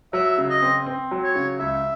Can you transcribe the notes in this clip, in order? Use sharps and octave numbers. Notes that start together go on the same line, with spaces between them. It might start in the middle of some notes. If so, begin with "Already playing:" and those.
F#3 E5
C#3
D#5
C4
C4
F#3
C#5
C#3
C#2 E5